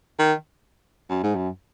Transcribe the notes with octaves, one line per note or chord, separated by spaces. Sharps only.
D#3
F#2
G#2
F#2